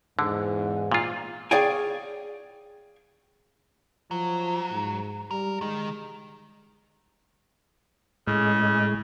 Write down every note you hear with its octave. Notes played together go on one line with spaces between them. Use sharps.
E2 G#2 D3
A#2 F4
G#4 C#5 D5 F5 G5 G#5
F3 F#3
G#2
G3 A#4
D#3 G#3 D#4
A2 C#3 G#3